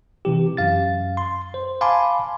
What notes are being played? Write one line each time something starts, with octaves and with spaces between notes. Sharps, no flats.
C3 E3 G4
F#2 F5 A6
C6
C5
F5 G#5 A5 B5 C6 D6